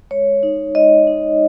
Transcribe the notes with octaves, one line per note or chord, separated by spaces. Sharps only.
G#3 C#5
D#4
G#3 D#5
D#4